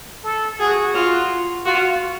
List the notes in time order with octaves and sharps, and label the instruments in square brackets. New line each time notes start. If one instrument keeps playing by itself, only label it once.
[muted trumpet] A4
[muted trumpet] F#4 [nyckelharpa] G#4
[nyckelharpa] F4
[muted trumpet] F4 [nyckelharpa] F#4